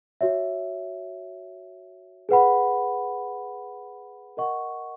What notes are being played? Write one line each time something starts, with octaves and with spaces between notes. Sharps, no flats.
F#4 C#5 E5
G#4 B4 F#5 B5
A#4 D#5 F#5 C#6